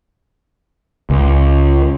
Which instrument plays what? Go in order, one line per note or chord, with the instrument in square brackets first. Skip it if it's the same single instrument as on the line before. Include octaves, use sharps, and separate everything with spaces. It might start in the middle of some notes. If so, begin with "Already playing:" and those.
[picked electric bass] C#2